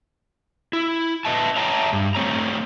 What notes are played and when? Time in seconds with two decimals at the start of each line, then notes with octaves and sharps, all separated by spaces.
0.73 E4
1.25 B4 D#5 E5 A5
1.56 C#5 E5 G5 A5 A#5
1.93 G2
2.15 A3 C4 C#5 A#5